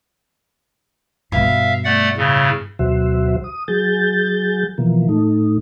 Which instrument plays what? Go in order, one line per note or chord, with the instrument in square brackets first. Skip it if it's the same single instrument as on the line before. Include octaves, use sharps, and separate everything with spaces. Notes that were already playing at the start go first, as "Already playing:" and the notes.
[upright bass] G2 B2 [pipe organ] E5 F5
[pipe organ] A3 D5 F#5
A2 C#3
[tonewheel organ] D2 B2 F#3 F#4 C5 E5
D#6
F#3 G#4 G6 A6
B2 E3 F3 A#3
A2 A3 D#4